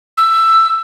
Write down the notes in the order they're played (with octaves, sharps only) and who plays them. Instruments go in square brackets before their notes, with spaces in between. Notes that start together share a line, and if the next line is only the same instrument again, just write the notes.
[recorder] E6